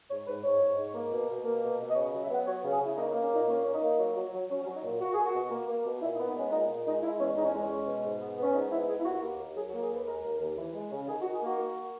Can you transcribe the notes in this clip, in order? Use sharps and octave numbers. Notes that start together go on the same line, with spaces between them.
G#2 C#5
G#2 B4
G#2 C#5
G#2
G#2
A#3
B2
B2
A#3
B2
B2
D#5
C#3 C#5
D#5
F#3
E5
B3 F#5
F#3 C#5
C#3
G#4
C#3 E4
A#3 D#4
D#4
A#3
C#4
A#2 D#4
A#3 C#4
A#3 C#4
D#4
A#3
F#3
F#3
F#3
F#3 C#4
C#4
F#3
D#4
A#2
A#3 F#4
A#3 G#4
F#4
B2
A#3
A#3
B2
A#2 E4
D#4
B3
D#4
G#3 C#4
A#2 D#4
A#2
G#3 D#4
G#3 E4
E2 C#4
E2 D#4
C#4
G#3
C#4
G#3
B2
G#2
B3
B3
C#4
G#2 D#4
B3 E4
B3 G#4
E4
D#2 F#4
A#3
D#2
F#3 G#4
F#4
A#3
G#4
D#2 B4
G#3 A#4
D#2
D#2
E3
G#3
C#3
D#3 G#4
F#4
D#3
G#4
A#3 F#4
A#3